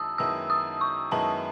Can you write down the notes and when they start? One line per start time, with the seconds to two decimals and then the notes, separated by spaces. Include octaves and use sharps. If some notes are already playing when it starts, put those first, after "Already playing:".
Already playing: F#2 D#3 G#3 E4 A5 D#6 E6
0.18 F#2 D#3 G#3 B3 E4 E6
0.50 D#6
0.81 C#6
1.11 F#2 D#3 G#3 B3 E4 A5